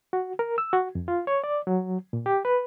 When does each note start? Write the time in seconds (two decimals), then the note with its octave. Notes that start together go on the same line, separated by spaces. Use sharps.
0.13 F#4
0.39 A#4
0.58 E6
0.73 F#4
0.95 F2
1.08 F4
1.27 C#5
1.44 D5
1.67 F#3
2.13 A#2
2.26 G4
2.45 B4